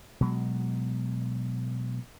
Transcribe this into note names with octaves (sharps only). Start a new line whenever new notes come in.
B2 F#3 G#3